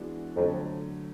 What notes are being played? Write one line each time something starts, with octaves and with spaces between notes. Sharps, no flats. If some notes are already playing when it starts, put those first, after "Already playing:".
Already playing: E3 G#3 B3 D4 F#4
F2 D3 F#3 A3